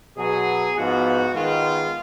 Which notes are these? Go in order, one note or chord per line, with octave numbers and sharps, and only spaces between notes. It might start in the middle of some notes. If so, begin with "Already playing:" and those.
B2 F#3 B3 G#4
G#2 F3 B3 F#4
D#3 G#3 B3 F4